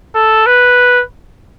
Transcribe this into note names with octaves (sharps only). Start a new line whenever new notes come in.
A4
B4